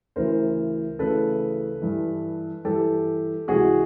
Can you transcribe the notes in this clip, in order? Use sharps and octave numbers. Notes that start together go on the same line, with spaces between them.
D2 C#3 E3 A#4 C5
D2 C#3 E3 A4 B4
G2 E3
G2 E3 G4 A4
C#2 C3 E3 F#4 G#4